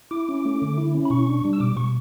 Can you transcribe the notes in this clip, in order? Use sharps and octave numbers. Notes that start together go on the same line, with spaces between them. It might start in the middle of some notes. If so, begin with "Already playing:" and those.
E4 D6
C#4
A3
D3
E4
C#4
B5
B2 C#6
D4
G3
E6
B2 D6
B2 C#6